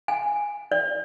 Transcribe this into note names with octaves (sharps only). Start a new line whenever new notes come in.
G#5
D5